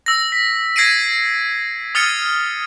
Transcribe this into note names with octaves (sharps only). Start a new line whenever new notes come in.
E6 A#6
B6
G#6 A#6 C7 D7 D#7
D#6 F6 A6 C#7 D#7 G7